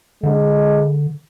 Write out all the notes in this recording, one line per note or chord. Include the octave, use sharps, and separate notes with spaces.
D3 G#3